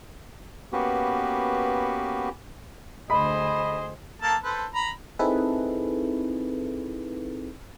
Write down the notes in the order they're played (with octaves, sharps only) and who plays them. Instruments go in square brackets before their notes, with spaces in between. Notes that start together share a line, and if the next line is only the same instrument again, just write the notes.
[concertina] A#3 B3 C#4 F#4 G4 B4
[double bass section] D2 [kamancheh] G#4 C5 [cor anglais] D#5 [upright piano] B5
[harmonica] A#3 A4 A5
A4 B4 C5
A#5 B5
[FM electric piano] C4 D#4 E4 G#4 A4 B4